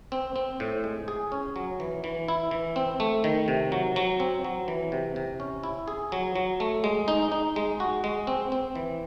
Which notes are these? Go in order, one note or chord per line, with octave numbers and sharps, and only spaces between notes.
C4
C4
A2
G#3
G#4
C#4
F#3
E3
E3
E4
E3
C4
A3
D#3
C3
F#3
F#3
C4
F#3
E3
C3
C3
C#4
E4
G#4
F#3
F#3
A3
G#3
D#4
D#4
G#3
F#4
G#3
C4
C4
E3